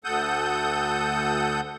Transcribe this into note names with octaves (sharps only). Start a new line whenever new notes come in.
D2 A4 F#5 D#6 G6